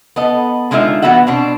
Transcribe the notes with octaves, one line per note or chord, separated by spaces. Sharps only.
B3 A4 D#5
D3 G#3 D#4 F4 E5
D3 E3 B3 F#4 E5 F#5
B2 C4 D4